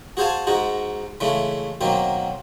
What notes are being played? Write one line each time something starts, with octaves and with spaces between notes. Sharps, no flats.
F#4 G#4 C5 F5 G#5 A5
G#2 G#3 D#4 F#4
C#3 E3 G#3 A3
B2 D#3 F#3 A#3 C4